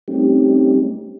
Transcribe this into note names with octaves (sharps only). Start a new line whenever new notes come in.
G3 A3 C4 C#4 D#4 G4